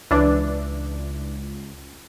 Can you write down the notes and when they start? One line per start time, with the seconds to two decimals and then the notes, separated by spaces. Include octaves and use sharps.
0.11 C#2 E3 D4